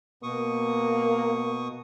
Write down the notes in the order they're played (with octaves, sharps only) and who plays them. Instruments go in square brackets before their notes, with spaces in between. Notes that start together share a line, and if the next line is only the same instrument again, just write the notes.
[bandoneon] B2 C#6 D#6 [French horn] A#3